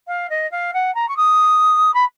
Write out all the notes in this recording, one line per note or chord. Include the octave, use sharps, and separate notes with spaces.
F5
D#5
F5
F#5
A#5
C#6
D#6
B5